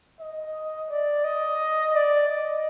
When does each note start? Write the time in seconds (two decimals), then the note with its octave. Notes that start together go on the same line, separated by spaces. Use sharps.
0.20 D#5
0.90 D5
1.24 D#5
1.93 D5
2.28 D#5